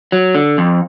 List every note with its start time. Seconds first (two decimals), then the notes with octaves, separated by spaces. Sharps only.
0.12 F#3
0.35 D3
0.58 F2